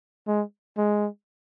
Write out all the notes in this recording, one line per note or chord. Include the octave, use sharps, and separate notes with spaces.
G#3
G#3